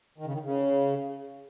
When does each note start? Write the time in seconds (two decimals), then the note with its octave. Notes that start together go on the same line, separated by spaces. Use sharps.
0.18 D#3
0.25 C#3
0.34 D#3
0.45 C#3